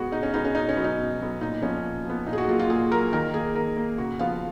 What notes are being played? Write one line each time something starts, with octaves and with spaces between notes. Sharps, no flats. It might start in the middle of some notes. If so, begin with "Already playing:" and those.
Already playing: B2 G#3 B3 F#4 G#4
B2 D#4
C#4
G#3 B3 D#4
C#4
B2 D#4
C#4
F#3 B3
D#4
B2
F#3 B3
A#2 D#4
F3 B3 C#4
A#2
F3 B3
A#2 D#4
G#4
F#4
F#3 A#3 F4
F4
A#2 G#4
F#3 A#3 A#4
D#3 A#4
A#3 G#4
D#3 A#4
A#3
C#3 F#4
F3 B3 F5